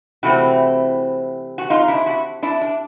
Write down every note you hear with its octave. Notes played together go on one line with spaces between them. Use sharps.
C3 E3 A3 C4 E4 F#4
F#4
D#4 F4
D4 E4
E4 F#4
D4 E4
D4